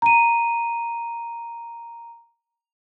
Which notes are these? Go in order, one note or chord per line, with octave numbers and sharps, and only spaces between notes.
A#5 D#7